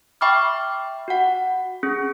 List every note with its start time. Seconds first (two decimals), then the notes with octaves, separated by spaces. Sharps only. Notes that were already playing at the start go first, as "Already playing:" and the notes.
0.21 E5 G5 B5 C#6 D6 F6
1.08 F#4 F#5
1.83 C#4 G#4